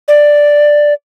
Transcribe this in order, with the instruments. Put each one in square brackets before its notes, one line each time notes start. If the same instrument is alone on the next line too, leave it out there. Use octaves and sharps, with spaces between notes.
[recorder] D5